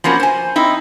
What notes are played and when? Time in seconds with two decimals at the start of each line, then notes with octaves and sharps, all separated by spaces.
0.04 F3 A#3 B3 C#4 F#4
0.20 C5 G#5
0.56 C4 D#4 E4